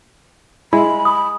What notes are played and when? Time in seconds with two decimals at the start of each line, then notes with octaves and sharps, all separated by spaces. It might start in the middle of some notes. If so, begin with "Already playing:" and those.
0.73 G#3 E4 B5
1.05 D#6